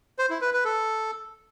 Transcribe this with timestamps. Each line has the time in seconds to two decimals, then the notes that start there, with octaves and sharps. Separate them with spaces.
0.19 C5
0.30 E4
0.42 B4
0.53 B4
0.65 A4